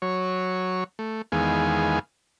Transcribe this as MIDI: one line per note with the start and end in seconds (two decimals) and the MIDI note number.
0.02 0.84 54
0.02 0.84 73
0.99 1.22 57
1.32 1.99 40
1.32 1.99 51
1.32 1.99 56
1.32 1.99 59
1.32 1.99 77
1.32 1.99 80